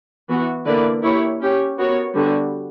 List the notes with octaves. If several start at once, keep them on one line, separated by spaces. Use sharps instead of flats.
E3 B3 F#4
D3 A#3 E4 B4 D5
A#3 E4 G4 C#5
C#4 G4 C#5
B3 F#4 A#4 C#5
D3 G3 B3 F#4